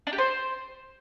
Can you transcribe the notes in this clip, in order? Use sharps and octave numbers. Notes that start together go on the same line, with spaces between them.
D4
G4
C5